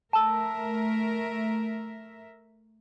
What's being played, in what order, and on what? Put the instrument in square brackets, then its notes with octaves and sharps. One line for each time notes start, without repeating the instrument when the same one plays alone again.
[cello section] A3 A#4 E5 [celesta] A5 E6